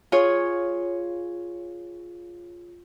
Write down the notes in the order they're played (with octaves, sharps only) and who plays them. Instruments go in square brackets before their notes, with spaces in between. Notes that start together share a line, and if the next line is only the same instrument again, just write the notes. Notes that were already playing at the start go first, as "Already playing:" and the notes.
[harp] F4 G#4 C#5